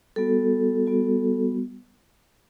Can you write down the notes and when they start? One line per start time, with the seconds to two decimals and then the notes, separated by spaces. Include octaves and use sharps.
0.16 G3 B3 F#4 A4
0.87 G3 B3 F#4